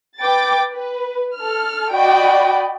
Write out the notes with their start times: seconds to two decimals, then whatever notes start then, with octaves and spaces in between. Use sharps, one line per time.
0.21 B4 G5 D6 A6
0.72 B4
1.38 A4 F6
1.94 F#4 D5 D#5 G5 B5